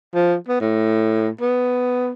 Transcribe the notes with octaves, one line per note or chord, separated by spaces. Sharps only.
F3
B3
A2
B3